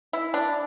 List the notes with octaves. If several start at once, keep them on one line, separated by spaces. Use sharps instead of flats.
E4
D4